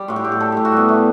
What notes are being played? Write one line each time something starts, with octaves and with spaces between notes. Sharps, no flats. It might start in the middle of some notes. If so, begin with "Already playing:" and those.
Already playing: G3
A2 F#4
G4
A2
G4
G3 A4
A2 G4
F#4
G3 B3
G3 A3